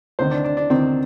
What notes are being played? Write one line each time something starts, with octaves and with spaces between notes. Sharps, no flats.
D2 C3 D#3 C5
D4
D4
D4
D2 C3 D#3 C4